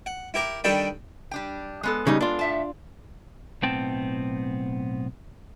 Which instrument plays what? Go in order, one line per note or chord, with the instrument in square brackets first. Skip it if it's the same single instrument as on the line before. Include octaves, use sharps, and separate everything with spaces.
[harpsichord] F#5
E4 G4 A#4
D#3 G3 D4 A4 G5 B5
[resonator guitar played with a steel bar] G3 D4 G5
G#3 B3 A4
[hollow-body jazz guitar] C#3 G3 D#4
D4 F4
[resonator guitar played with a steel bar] A2 E5 A5
[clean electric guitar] B1 A2 B3 C4 G5 A5